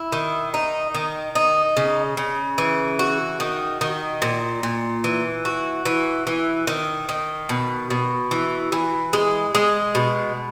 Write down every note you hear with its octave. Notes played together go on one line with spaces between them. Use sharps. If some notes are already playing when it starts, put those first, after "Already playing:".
Already playing: E4
D#3
D#4
D#3
D#4
C#3
C#3
E3
F#4
D#3
D#3
A#2
A#2
E3
F#4
E3
E3
D#3
D#3
B2
B2
E3
E3
G#3
G#3
B2